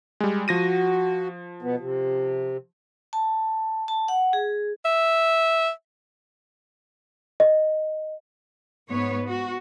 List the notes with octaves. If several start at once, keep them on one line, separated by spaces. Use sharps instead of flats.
G3 G#3
F3 F#4 A#6 D#7
B2 B3
C3
A5
A5
F#5
G#4
E5
D#5
G#2 B3 C#5
F#4